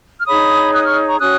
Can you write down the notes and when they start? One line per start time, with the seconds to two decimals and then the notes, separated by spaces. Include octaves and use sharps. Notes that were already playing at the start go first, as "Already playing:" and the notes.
0.20 F6
0.27 D#4 G#4 C#5 B5 D#6
0.73 D#6 F#6
0.84 C#6 F6
1.07 A#5 C#6
1.19 C#4 F#4 C#5 D#6 F#6